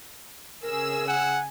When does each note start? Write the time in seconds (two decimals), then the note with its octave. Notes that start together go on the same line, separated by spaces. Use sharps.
0.63 C#3 G#4 A#4 E6
1.08 F#5 G#5